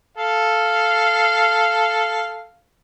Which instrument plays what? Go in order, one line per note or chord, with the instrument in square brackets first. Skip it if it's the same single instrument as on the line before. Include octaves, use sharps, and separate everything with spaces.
[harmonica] A4 F5